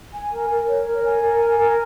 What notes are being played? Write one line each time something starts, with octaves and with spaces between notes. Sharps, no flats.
G#5
A#4
A#4
C#5
A#4
G#5
A#4
G#5
A#4